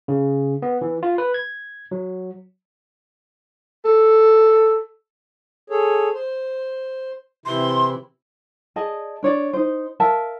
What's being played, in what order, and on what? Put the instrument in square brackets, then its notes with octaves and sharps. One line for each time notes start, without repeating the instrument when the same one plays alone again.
[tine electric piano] C#3
B3
E3
F4
B4
G#6
F#3
[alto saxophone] A4
[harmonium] G#4 A4 C#5
C5
[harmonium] C3 E3 E4 [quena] C6
[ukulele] G#4 D5 D#5 A5
D4 C#5 D5
D#4 C5
A#4 E5 F5 A5